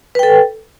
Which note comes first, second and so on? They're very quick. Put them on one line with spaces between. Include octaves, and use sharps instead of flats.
B4 G5 A4